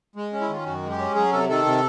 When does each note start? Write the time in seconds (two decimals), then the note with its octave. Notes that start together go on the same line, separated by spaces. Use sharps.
0.16 G#3
0.33 C#4
0.41 E4
0.49 D#3 F4
0.66 F#2 F#4
0.83 G#3
0.90 G4
0.99 C#4
1.15 F#3 G#4
1.32 C3 A4
1.49 D#3 A4
1.65 C3